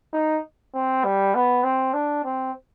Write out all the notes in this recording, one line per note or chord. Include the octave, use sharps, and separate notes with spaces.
D#4
C4
G3
B3
C4
D4
C4